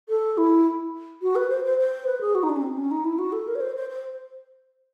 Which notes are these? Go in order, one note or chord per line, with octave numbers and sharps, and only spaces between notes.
A4
E4
F#4
B4
C5
C5
C5
B4
G#4
F#4
D#4
D4
C#4
C4
C#4
D#4
E4
F#4
A4
A#4
C#5
C5
C5
C5